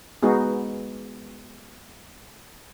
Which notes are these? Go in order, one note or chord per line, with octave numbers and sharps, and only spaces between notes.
G#3 B3 D#4 F#4 G#4